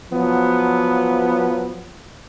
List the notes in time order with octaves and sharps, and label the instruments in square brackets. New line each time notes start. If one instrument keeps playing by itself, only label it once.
[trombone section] F3 F#3 B3